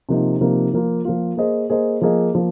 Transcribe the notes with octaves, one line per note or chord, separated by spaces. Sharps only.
C3 F3 A#3 D#4
C3 F3 A#3 D#4
F3 A#3 F4
F3 A#3 F4
A#3 G#4 C5 D#5
A#3 G#4 C5 D#5
F3 A#3 G#4 D#5
F3 A#3